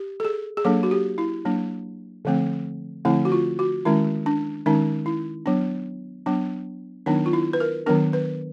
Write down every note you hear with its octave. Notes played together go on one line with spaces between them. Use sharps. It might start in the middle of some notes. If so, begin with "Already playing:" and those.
Already playing: G4
A4
G#4
G#4
F#3 A#3 D4 A4
F#4
G4
E4
F#3 A#3 D4
D3 F3 A3 C4
D3 F3 A3 C4 E4
F#4
F4
F#4
D#3 G#3 C#4 E4
D4
D#3 G#3 C#4 D#4
E4
F#3 B3 D4
F#3 B3 D4
D#3 F#3 B3 D4 D#4
F4
E4
B4
A#4
D#3 F#3 B3 D4 A#4
B4